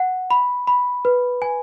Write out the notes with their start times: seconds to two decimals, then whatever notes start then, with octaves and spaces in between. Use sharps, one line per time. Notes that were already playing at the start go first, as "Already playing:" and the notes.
Already playing: F#5
0.31 B5
0.67 B5
1.05 B4
1.42 G#5